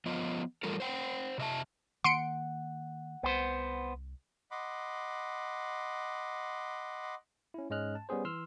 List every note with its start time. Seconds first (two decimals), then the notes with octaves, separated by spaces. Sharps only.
0.06 F3 B3 F4 D#5
0.63 E3 G3 F4 A4 A#4
0.80 C5 F#5 G5
1.38 C3 D#5 E5 A5
2.04 D#3 A#3 F#5 C6 C#7 D7
3.23 C2 B3 C5
4.51 D#5 F#5 B5 C6 D6
7.54 C#4 E4
7.70 G#2 G#3 C#4 D#5 F6 F#6
7.95 A5
8.09 G3 B3 C#4 G#4 C5
8.25 E3 C6 E6 F6